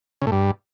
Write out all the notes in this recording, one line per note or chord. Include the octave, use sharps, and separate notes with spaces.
C#3
A2
G2